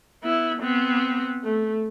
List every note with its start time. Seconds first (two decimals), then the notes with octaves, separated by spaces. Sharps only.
0.23 B3 E4
0.60 B3 C4
1.44 A3